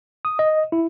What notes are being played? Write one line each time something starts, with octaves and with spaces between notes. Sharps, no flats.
D#6
D#5
E4